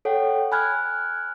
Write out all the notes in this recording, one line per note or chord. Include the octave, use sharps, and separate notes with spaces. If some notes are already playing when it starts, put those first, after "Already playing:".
A4 C#5 F#5 G5
G#5 B5 F6 F#6 G#6